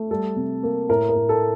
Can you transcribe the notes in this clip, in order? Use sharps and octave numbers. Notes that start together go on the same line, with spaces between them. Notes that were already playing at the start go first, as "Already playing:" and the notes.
Already playing: A3
G3 A4
C3
A#3
A2 A#4
A#4
A2
A4